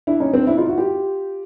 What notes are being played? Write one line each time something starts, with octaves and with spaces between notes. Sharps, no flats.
D4 E4
C#4 D#4
C4 D4
D4 E4
D#4 F4
E4 F#4
F4 G4